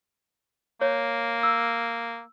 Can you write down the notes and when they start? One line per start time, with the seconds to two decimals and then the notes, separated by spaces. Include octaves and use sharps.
0.81 A#3 C#5
1.43 E6